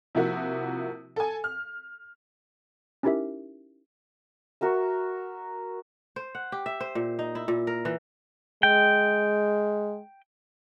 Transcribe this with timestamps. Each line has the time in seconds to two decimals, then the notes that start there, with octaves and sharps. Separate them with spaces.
0.15 C3 F3 A#3 E4 F#4
1.16 A4 G#5
1.44 F6
3.03 C#4 D#4 E4 G4 A#4 E5
4.61 F#4 A#4 E5
6.16 C5
6.35 F#5
6.52 G4
6.66 E5
6.80 C5
6.95 A#2
7.19 D#4
7.35 E4
7.48 A#2
7.67 A#4
7.85 E3
8.63 G#3 G5